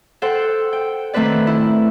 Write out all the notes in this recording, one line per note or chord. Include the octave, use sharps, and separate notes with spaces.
A4 C5 F#5 G5
G5
D#3 A3 C4 A4 B4 D5
E4